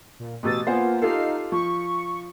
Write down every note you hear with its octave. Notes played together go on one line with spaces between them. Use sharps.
A#2
A1 B2 G4 D#6 E6 A6
A#3 B3 F4 C5 F#5 G#5
D#4 F4 G4 A4 F5 C7
F3 C#6